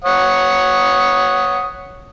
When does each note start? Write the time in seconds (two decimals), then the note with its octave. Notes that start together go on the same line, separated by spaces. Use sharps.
0.04 C#5 F#5 D#6